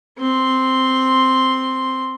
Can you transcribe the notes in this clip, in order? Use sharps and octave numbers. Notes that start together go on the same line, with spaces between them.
C4 C6